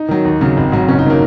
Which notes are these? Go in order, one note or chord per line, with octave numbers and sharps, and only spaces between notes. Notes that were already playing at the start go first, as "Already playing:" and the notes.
Already playing: D#4
D#3 F#3
D#2
C#3 F#3
G#1
G#2 F#3
F#1 C#4
D#4
D#3 F#3 A#3